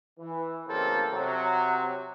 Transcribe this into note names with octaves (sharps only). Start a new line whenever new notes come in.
E3
A1 C#3 A#3 C4 A4
C3 F#3